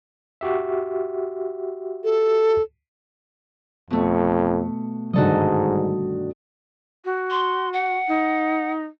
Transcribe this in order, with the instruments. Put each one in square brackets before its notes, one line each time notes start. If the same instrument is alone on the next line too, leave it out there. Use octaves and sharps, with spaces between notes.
[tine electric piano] F#4 G4 E5
[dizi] A4
[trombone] F2 [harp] B2 A3
[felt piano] G1 D3 D#3 [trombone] G#2 [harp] F#4 A4 D#5
[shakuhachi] F#4
[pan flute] C6
F#5
[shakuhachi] D#4